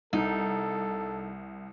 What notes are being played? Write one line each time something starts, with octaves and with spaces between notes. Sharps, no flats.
C2 D#4 A4